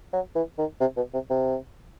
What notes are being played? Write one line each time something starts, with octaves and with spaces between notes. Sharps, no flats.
F#3
E3
D#3
C3
B2
C3
C3